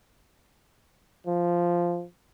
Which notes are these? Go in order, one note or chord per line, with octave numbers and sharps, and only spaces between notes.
F3